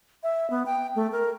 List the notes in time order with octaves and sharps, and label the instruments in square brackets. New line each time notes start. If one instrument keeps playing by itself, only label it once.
[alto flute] E5
B3
G5
A3
A#4